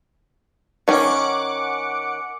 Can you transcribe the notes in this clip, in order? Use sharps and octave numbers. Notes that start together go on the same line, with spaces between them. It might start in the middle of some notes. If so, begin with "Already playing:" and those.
D#3 C#4 F#5 D6 C#7